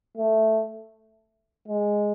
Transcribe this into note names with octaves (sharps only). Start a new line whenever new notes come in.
A3
G#3